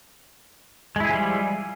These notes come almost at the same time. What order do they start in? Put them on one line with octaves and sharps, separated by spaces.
G#3 E4 G#4 F3 G3